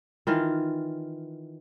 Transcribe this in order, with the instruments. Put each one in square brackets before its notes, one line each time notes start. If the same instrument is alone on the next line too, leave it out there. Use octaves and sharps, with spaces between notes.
[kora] D#3 E3 F4